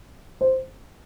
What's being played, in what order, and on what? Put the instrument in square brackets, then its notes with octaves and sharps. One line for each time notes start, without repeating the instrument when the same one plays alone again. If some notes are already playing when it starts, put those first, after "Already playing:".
[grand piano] C5